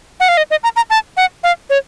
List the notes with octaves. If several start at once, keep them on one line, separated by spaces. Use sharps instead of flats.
F#5
F5
D#5
D#5
A#5
A#5
A5
F#5
F5
C#5